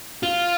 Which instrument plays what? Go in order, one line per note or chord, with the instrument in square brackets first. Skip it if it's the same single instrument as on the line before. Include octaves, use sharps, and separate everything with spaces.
[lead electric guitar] F4